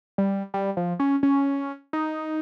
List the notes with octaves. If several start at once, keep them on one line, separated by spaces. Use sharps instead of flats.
G3
G3
F3
C#4
C#4
D#4